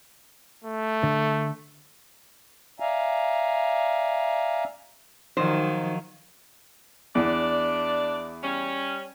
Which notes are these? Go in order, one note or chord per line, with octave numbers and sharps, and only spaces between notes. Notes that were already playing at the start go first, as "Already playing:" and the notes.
A3
D3
D5 E5 F5 G#5 A#5
D#3 F3 F#3 D#4 F#4 C5
E2 D4 D5
G3 C#4